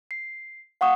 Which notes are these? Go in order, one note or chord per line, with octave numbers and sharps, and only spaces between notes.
C7
F5 F#5 C#6 D#6